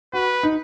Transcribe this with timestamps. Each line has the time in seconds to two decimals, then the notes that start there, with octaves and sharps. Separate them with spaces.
0.13 F#4 B4
0.43 D#4